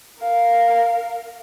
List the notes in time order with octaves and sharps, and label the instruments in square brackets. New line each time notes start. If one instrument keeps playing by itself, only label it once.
[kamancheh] A#4 F5